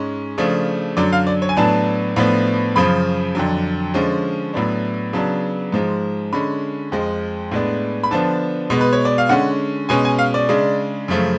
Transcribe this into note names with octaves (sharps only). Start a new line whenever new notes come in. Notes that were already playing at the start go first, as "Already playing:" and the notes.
Already playing: G#2 G#3 C#4
C#3 F3 A3 D4
F#2 D3 F#3 D5
F5
D5
C#5
G#5
A2 F#3 B3 D4 A5
A2 F3 B3 D4
F#2 C#3 F3 B5
F2 D3 F#3
D3 F3 G#3 C#4
A2 F#3 B3 D4
C#3 F#3 B3 D4 A5
G#2 F3 G#3
D3 G#3 C#4 B5
F2 F3 G#3
A2 G#3 B3 D4
B5
D3 F3 B3 D4 A5
B2 G#3 B3
B4
C#5
D5
F5
D3 G#3 C#4 F#5
B2 G#3 C#4 G#5
G#5
F5
D5
C#3 G#3 D4
F#2 C#3 F3 A3